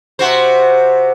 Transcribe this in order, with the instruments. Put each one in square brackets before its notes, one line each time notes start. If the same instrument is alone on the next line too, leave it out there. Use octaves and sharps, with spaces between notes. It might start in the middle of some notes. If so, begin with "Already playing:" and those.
[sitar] C3 F#4 C5